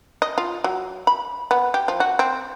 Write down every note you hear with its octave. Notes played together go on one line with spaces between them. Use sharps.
D#5
F4
F#3
B5
B3
G4
F3
F#4
C4